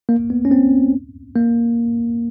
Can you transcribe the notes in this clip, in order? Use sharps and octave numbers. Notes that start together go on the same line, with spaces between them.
A#3
B3
C#4
C4
A#3